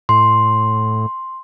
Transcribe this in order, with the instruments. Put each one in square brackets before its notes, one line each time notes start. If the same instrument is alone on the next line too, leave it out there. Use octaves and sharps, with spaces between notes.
[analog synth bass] A2 [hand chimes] C6